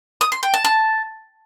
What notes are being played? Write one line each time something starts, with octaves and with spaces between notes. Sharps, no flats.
D#6
C6
G5
A5
A5